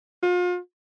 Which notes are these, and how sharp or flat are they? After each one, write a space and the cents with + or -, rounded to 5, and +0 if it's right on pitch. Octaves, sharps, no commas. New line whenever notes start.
F4 +35